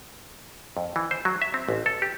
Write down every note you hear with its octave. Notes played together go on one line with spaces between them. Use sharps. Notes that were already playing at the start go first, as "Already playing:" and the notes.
F2
E3
C5
F#3
E5
C4
A1
A4
G4